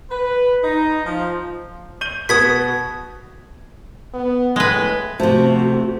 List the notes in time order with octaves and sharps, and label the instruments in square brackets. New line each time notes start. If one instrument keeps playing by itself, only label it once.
[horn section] B4
D#4
F3
[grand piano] G6 D#7 G7
[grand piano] B2 B3 F#4 [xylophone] D#6 G#6 B6
[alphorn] B3
[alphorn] A2 [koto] G#3 B4
[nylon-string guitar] C3 F3 [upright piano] A3 [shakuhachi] F#4